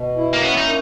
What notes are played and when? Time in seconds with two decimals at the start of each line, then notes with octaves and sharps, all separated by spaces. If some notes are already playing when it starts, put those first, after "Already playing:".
Already playing: B2
0.17 E4
0.33 A#3
0.41 B3 C#4
0.57 D#4
0.65 A#3